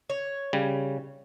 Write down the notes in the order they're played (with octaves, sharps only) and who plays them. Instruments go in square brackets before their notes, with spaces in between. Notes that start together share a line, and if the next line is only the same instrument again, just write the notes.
[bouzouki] C#5
[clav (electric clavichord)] C#3 G3